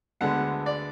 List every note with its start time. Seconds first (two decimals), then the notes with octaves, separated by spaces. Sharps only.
0.21 D2 D3 G#3 B3 F#5
0.66 D5